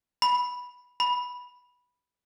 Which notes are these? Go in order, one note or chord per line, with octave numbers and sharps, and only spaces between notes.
B5
B5